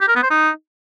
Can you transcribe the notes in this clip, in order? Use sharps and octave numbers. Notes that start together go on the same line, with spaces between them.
G4
A#4
B3
C5
D#4